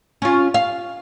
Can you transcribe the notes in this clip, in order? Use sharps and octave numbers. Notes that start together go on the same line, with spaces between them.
C#4 F4
F5